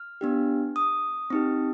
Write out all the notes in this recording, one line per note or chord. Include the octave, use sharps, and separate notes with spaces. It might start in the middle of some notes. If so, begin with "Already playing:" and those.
Already playing: F6
B3 D4 G4
D#6
C4 D#4 G4